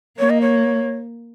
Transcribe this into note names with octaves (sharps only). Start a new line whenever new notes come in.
A#3 C#5
D#5
C#5